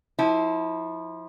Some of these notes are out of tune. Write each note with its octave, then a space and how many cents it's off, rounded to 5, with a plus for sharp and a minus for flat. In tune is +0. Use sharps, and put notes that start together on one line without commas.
F3 +0 E4 -30